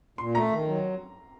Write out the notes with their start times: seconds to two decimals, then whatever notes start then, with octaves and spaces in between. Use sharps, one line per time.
0.18 A#2 C6
0.34 A3 A#5
0.51 D#3
0.68 F#3